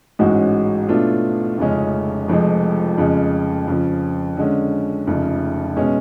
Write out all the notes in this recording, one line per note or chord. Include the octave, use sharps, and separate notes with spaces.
A1 G#2 G#3 C#4 F#4
B2 A3 D4 F4
F1 F2 C#3 G#3 C#4
F1 F2 F3 G#3
F2 C#3 G#3
F2 C#3 F3
D3 G#3 C#4
F1 F2 C#3
B2 G#3 C#4